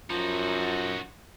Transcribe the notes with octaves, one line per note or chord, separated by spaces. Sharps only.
F#2 F3 D#4 F#4